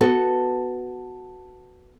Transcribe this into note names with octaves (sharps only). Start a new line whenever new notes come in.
B3 F#4 A4